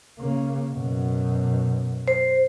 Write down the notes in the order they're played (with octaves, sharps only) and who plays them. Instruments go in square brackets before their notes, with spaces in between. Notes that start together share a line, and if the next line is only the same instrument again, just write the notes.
[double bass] C#3 A#3
F#2 B2
[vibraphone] C5